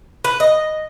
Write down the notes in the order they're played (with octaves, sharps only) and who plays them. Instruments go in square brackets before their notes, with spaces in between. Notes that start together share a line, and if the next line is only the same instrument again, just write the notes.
[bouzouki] B4
D#5